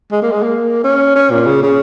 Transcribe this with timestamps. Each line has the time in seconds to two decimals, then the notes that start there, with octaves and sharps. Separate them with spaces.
0.12 G#3
0.22 A#3
0.32 G#3
0.42 A#3
0.84 C#4
1.15 C#4
1.31 A#2
1.47 C#3
1.63 C#3